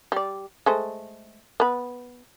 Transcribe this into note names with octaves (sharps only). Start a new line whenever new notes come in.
G3 D5
G#3 A3 C5
B3 B4